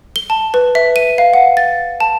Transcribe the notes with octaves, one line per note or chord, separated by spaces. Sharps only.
G7
A5
B4
E5
D#7
F5
F#5
A6
A5